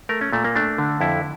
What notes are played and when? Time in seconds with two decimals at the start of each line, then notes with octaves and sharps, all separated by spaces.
0.09 A3 A#4
0.21 C#4
0.33 A#2 A3
0.44 A#3
0.56 A3 D4
0.78 D3
1.01 F2 E4